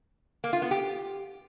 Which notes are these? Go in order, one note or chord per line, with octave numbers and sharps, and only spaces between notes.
A#3
F4
B3
G4